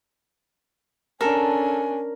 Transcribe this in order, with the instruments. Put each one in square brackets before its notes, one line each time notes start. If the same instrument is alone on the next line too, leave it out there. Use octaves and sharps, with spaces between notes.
[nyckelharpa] C#4 D4 [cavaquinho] A4 [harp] A#4 [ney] G#5